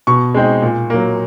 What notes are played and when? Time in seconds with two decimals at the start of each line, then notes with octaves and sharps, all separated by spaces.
0.07 B2 C#6
0.34 G#3 C4 D#4
0.62 A#2
0.90 F#3 A#3